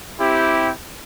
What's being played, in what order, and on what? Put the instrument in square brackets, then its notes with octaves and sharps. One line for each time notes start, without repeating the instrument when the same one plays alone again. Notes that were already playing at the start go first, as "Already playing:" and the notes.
[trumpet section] C4 E4 G4